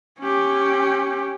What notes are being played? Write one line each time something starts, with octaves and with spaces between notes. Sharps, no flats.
C#4 G4